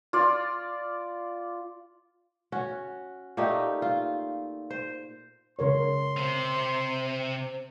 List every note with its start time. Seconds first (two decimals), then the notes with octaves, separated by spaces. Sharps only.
0.13 F4 D5
2.52 C#4 F#4
3.37 A#2 A3 D#4 G4
3.82 F4
4.70 C5
5.59 C#3 A#4 C#5 C6
6.17 C3 C5